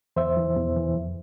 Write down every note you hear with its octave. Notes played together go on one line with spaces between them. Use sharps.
E2 C5 E5
E3
E2
E3
F2